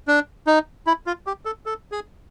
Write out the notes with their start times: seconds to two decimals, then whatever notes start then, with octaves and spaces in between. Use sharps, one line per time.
0.08 D4
0.47 D#4
0.87 E4
1.06 F4
1.27 G4
1.45 A4
1.66 A4
1.92 G#4